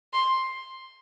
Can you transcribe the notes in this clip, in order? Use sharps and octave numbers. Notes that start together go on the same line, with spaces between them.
C6